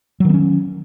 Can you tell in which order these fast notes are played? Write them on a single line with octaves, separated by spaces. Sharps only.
F#3 D#3 B3 C#4